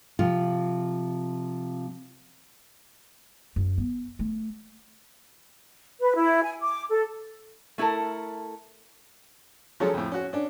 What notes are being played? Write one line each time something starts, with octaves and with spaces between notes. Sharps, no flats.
C3 F3 F4
F#2
B3
A3
B4
E4
G#5
D6
A4
A3 E4 A4 A#4
F3 F#3 G#3 C#4 G#4 A4
F2 A2
C#4 F#4
C#4 D4